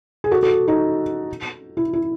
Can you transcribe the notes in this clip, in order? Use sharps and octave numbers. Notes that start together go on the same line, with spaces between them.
G#4
F#4 A4
F#4 A4
D#4 F#4
E4
E4